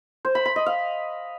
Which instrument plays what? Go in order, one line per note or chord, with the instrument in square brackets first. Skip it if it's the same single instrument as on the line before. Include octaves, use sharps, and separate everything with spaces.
[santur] C5
B5
B5
D#5
F5